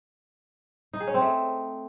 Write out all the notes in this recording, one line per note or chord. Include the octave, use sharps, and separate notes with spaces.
D#4
G#4
C#4
C4
A3